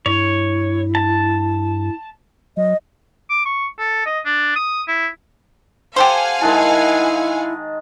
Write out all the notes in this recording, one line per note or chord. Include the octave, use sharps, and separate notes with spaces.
G2 E4 C#5
A5
F#3 D#5
D6
C#6
A4
D#5
D4
D#6
E4
G4 A4 C5 F5 F#5 G#5
D#3 G#3 E4 A5